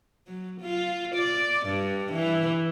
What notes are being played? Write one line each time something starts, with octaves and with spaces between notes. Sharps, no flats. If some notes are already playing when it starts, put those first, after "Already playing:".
F#3
F4
D5
G2
E3